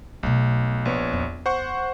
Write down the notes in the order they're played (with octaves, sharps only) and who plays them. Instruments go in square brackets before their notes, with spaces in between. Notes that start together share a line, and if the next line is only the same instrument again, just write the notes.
[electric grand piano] B1 [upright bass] B2 A3
[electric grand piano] A#1 B3 C#5
[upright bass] E2
[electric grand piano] C5 F#5 C#6